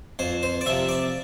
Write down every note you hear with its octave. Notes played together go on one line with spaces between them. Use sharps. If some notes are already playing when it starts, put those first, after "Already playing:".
F2 C5
C5
D5
C3 F3 E5
D5